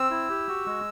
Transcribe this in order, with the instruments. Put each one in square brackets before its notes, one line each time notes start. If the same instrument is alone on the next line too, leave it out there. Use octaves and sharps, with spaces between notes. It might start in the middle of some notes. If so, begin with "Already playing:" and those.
Already playing: [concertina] C4 E6
E4
G4
F#4
G#3